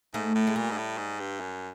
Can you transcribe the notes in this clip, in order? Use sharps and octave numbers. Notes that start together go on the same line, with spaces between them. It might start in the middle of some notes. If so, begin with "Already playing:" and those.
G#2 A3
A2
G#3
A#2 G3
G#2
A2
G#2
G2
F#2